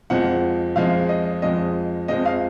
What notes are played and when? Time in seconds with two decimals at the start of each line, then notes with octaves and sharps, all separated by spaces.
0.10 F2 F3 G#3 F#5
0.76 F2 F3 G#3 F5
1.09 D#5
1.42 F2 F3 G#3 D#5
2.08 F2 F3 G#3 D#5
2.26 F5